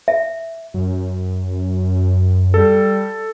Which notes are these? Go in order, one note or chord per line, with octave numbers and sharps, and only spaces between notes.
E5
F#2
G3 A4